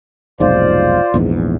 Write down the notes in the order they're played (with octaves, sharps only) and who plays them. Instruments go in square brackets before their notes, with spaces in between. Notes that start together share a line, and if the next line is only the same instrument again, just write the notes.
[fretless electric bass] F1 B1 G#2 [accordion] F4 C5 D5
[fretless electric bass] A#1 E2 G#2